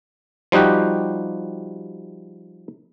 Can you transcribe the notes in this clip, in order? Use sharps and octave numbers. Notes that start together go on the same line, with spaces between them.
F3 G3 D#4 F#4 G4